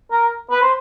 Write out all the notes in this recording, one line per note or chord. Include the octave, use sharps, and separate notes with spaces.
A#4
B4
C5